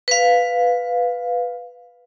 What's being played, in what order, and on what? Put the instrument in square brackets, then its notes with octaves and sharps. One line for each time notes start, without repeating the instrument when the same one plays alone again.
[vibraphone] B4 F5